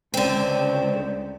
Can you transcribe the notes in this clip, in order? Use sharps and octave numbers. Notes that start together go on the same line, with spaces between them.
C#2 D3 C4